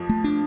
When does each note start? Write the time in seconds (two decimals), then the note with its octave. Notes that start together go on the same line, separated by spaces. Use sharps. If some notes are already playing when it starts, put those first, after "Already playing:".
Already playing: F2 F3
0.09 A3
0.24 D4